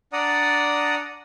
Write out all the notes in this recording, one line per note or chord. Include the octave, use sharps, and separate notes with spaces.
D4 D5 F#5 A#5 D#6